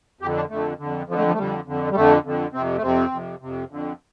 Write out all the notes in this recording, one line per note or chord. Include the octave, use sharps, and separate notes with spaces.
F2 G4
D3
D4
F2 D3 A3
F2 D3
F2 D3 F3
A3
F3
A3
F2 D3 G3
F2 D3
G3
F2 D3 A3
F2 D3
F2 C3 C4
A3
F2 C3 C4
F2 C3
F2 C3
F2 D3